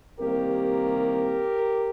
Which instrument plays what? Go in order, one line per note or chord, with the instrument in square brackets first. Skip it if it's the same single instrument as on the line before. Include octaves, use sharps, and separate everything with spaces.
[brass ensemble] C2 C3 D#3 A#3 G4 A#4